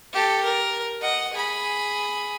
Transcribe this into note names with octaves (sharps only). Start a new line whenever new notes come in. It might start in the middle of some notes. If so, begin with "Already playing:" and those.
G4 A4
A#4
D#5 F#5
G#4 B5